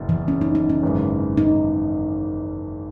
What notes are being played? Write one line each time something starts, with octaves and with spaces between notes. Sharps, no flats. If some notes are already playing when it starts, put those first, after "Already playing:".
Already playing: F#1 E2 B2
E3
C#4
D#4
D#4
C#4
G#1 F#2 C#3 E3
D#4